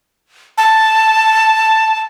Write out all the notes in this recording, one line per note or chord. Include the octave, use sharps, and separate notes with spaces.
A5